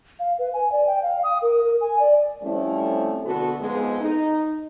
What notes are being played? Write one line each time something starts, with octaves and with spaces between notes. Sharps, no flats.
F5
B4
G#5
D5
G5
F5
D#6
A#4
A#4
G#5
D5
F3 G3 A3 C4 C#4 E4
B2 D3 B3 F#4 A4
F2 G#2 G#3 B3
D#4